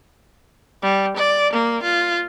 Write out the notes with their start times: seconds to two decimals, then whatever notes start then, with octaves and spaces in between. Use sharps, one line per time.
0.83 G3
1.17 D5
1.53 A#3
1.83 F4